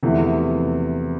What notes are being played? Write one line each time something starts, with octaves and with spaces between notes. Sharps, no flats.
E2 C3 F3 A3 E4